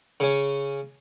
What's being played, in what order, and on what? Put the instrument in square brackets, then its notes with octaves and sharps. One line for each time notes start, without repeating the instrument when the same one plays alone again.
[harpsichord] C#3 C#4